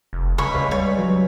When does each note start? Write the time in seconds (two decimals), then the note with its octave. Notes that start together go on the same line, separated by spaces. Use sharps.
0.13 F1
0.38 C#2 C#3 B5 C#6
0.55 D2 G#4 B4 F5
0.71 G3 C#5
0.98 F#3